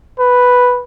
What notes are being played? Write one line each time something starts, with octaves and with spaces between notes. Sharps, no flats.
B4